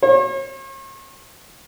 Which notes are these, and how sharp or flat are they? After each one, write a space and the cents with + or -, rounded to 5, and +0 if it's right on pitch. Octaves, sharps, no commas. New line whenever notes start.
C#5 -45